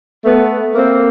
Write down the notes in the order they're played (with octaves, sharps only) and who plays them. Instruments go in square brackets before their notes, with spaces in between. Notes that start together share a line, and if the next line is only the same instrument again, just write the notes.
[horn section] A3 B3
A#3 C4